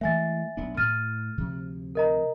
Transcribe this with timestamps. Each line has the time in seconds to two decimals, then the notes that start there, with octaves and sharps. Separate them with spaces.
0.01 E3 G#3 A3 E5 G#5 A6
0.57 B1 B3 D4
0.77 A2 F6 A6 D#7
1.38 D2 C3 F3
1.95 A#4 D#5 A#5